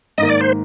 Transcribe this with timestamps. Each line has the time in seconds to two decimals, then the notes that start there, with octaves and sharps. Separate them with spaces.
0.18 G#2 D#3 A#3 D#5
0.29 D5
0.41 C5